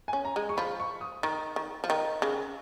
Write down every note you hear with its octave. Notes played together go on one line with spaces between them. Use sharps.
G#5
C#4
A#5
G#3
C#6
F3 B5
C#6
D#6
D#3 A#5
D#3
F3
D#3
C#3